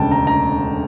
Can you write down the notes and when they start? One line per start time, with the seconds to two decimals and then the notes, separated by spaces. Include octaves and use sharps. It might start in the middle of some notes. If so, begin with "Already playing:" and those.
Already playing: E1 D2 C#3 G5 A5
0.11 A#5
0.27 A#5